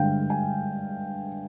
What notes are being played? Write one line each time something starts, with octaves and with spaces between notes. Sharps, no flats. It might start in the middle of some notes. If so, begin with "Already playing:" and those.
Already playing: G2 D3 G#3 F5 G5
G#5